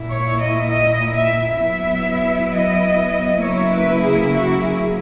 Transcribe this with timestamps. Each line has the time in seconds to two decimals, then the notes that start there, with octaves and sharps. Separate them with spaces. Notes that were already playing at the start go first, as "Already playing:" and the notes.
Already playing: A#2 A#3 E4
0.10 C#5
0.40 D#5
0.70 D#5
1.16 E5
1.60 F#3 B3 E4 E5
2.51 D#5
3.41 C#3 F#3 A#3 E4 C#5
3.72 B4
4.03 G#4
4.33 F#4
4.63 G#4